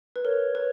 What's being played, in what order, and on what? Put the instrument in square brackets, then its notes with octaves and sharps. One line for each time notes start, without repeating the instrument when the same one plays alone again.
[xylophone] B4
[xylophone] A#4 [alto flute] C#5
[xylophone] B4 [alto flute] C#5